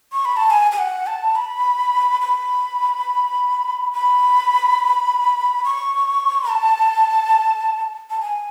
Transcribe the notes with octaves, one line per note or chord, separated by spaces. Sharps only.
C#6
B5
A5
G#5
G#5
F#5
A5
B5
B5
B5
C#6
A5
A5
G#5